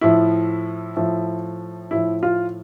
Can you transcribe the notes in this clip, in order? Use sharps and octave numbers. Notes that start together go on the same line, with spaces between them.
A2 F3 E4
A2 F3
A2 F3 E4
F4